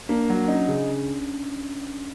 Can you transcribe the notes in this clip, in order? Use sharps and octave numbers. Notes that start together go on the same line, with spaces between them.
A#3 D4
F#3
C#4 D#4
C#3